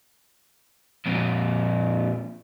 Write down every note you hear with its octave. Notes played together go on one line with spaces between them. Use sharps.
F2 A#2